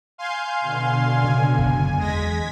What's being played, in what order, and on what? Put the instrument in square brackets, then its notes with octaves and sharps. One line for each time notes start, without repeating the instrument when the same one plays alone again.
[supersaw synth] F5 G#5 C6 [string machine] G6
[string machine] B2 D3
[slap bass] C#3 [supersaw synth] G#5
[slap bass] F#1
[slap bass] E2 [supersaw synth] G#3 A#6 [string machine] G#6 B6